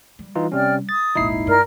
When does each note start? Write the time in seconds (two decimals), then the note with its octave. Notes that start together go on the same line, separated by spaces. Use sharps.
0.19 G3
0.36 E3 D#4 F4
0.52 C3 C#4 D5 G5 F6
0.89 D#6 A6
1.15 D#1 G#1 D#4 E4 C7
1.47 G2 A#4 D5 F6